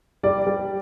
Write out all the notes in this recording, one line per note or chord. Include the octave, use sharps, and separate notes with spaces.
G3 D5
G3